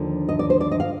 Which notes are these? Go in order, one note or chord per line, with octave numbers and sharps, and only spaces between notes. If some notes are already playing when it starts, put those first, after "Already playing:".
Already playing: D#2 D3 F3
D#5
D5
C5
D5
D#5
F5